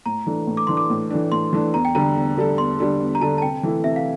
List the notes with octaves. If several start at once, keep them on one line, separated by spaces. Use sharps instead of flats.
A2 A#5
E3 A3 D4
A2
D6
E3 A3 D4 C6
D6
A2
E3 A3 D4
A2 C6
E3 A3 D4
E2 A#5
G5
D3 G3 D4 A4 A#5
E2
D3 G3 D4 A4
E2 C6
D3 G3 D4 A4
E2
A#5
D3 G3 D4 A4 A5
A5
C3 G5
E3 A3 E4
C3 E5
F5